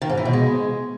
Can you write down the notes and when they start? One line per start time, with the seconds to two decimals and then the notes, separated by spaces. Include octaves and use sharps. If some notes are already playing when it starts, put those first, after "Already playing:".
0.02 D#3
0.09 G#2
0.17 E3
0.25 B2
0.33 G#3